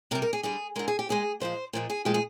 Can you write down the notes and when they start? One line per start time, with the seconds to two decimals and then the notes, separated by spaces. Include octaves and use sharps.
0.11 C3 A#4
0.15 G3
0.22 A#4
0.33 G#4
0.43 D3 G3 G#4
0.76 D3 G#3 A#4
0.88 G#4
0.99 G4
1.09 A#2 G#3 G#4
1.40 A#2 F3 G#3 C5
1.73 A#2 F3 G#3
1.90 G#4
2.05 A#2 F3 G#3 G4
2.14 G#4